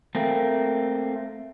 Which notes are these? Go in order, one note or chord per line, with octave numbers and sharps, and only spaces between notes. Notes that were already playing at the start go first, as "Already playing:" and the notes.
A3 A#3 C4